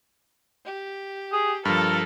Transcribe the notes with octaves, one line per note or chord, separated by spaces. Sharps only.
G4
G#4
G2 F3 A4 A#4